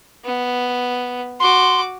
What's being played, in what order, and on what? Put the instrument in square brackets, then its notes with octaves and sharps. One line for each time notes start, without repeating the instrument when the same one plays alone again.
[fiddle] B3
[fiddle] F#4 D6 [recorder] C6